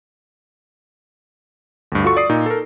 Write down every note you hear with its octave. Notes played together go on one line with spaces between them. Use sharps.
D2 G2
F4 F#4 A4 C#6
D5 D#6 C7
A#2 D#4
A4 A#4